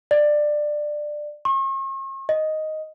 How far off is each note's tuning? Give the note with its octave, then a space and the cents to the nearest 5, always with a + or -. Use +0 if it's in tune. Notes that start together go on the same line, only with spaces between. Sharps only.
D5 +15
C#6 -45
D#5 +5